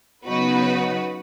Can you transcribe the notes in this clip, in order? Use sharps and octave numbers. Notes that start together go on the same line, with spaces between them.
C#3 F#3 B3 D#4 F#4 B4